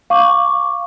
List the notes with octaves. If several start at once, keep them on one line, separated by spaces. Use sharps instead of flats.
F5 C#6 D6